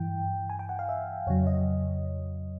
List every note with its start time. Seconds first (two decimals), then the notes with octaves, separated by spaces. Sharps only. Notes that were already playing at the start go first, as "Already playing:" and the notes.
Already playing: G2 E3 G5
0.50 G#5
0.59 G5
0.69 F#5
0.79 F5
0.89 E5
1.27 F2 C#3 F#3 C#5
1.47 D#5